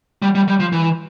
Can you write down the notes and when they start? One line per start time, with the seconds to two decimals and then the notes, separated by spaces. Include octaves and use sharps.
0.22 G3
0.35 G3
0.48 G3
0.60 F3
0.72 E3